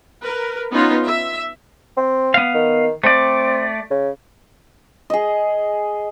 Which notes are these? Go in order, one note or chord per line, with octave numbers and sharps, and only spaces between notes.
A#4 B4
B3 C#4 D#4 F4
E5
C4
B3 F5
D#3
A3 C4 D5
C#3
G#4 D#5